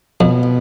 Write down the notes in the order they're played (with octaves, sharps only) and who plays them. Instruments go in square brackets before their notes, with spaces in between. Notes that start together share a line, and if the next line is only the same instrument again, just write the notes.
[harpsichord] F2 [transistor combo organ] B2